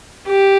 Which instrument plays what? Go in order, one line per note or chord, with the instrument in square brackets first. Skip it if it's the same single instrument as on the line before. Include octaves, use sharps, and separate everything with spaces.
[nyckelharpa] G4